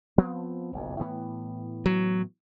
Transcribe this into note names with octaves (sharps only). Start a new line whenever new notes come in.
F3 B3 C4
F#1 B1 F2
A2 E3 B3
F#3